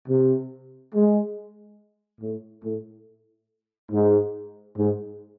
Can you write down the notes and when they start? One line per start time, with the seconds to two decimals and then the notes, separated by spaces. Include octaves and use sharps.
0.08 C3
0.94 G#3
2.21 A2
2.63 A2
3.91 G#2
4.76 G#2